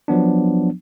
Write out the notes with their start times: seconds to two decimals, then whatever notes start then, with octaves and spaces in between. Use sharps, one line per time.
0.08 F3 F#3 B3 D4